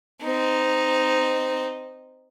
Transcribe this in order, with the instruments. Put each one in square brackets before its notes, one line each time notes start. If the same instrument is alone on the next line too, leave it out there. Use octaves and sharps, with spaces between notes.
[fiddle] C4 D#4